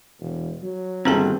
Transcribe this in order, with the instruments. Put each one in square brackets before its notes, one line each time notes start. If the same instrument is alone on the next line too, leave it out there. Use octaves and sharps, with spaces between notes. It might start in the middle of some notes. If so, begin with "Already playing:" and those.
[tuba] E1
F#3
[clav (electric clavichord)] G1 [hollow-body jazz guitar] D#2 B2 C4 [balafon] D4 G#4 A5